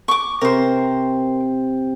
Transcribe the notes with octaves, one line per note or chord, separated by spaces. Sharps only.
C#6 D6
C3 A#4 C5